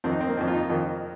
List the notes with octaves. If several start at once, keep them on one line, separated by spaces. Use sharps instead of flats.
F2 D#3 C4
D#4
C4
A#3
F2 D#3 C4
F4
D#4
F2 D#3